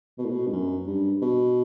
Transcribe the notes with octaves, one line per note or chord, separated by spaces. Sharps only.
B2
A2
B2
G2
F#2
G2
B2